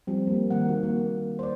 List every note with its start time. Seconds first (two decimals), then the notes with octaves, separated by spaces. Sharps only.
0.07 F3 G3 C4
0.27 A#3
0.50 D#3 A#3 F#5
0.69 F#4
0.83 A#3
1.39 C5 D5